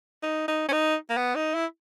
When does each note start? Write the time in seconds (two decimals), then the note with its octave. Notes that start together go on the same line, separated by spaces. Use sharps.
0.23 D#4
0.48 D#4
0.69 C#4
0.73 D#4
1.10 A#3
1.17 B3
1.35 D#4
1.55 E4